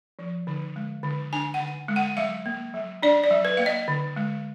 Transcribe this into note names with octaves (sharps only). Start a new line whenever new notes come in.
F3
D3
G#3
D3
D4 G#5
F#5
D3
G#3
F#5
F#3 F5
A#3
F#3
D4 D5
D5
F#3
B4
A#3 F5
D#5
D3
G#3